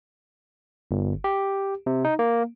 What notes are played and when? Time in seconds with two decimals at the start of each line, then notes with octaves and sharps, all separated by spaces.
0.91 G1
1.24 G4
1.86 C3
2.05 D#4
2.19 A#3